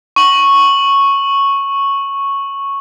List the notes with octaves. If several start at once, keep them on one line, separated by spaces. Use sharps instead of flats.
C#6 F#7